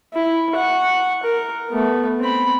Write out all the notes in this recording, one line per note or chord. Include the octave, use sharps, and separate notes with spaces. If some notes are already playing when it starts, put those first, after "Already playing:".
E4
F#5 C#6
A#4
A3 B3
C4 B5